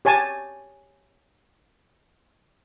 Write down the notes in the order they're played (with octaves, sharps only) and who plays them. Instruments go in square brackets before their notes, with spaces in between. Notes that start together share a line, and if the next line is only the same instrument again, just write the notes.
[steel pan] G4 C#5 G#5 A5